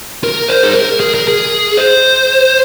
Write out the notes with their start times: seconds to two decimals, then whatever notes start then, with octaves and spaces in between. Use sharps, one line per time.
0.24 A#4
0.49 C5
0.64 G#4
0.75 A#4
1.00 G#4
1.14 A#4
1.28 G#4
1.77 C5